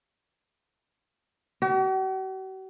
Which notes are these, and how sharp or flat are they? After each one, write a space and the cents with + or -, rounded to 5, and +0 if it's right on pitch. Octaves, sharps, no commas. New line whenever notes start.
F#4 +45